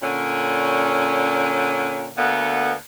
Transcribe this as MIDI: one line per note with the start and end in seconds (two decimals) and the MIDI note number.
0.02 2.08 46
0.02 2.08 50
0.02 2.08 61
2.17 2.72 38
2.17 2.72 50
2.17 2.72 58
2.17 2.72 59